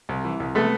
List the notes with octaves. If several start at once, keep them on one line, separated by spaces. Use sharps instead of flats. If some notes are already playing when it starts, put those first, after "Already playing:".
C2
E3
C2
C3 A3 B3